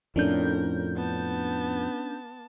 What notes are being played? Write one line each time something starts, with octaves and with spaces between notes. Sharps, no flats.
F2 A2 C#4 D4 A#4 G6
B3 A5